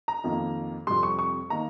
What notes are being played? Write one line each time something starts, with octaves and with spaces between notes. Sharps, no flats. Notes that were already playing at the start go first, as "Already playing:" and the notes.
A#5
F2 D#3 A#3
F2 C3 G3 C6
C#6
C#6
D#3 A#3 D#4 A#5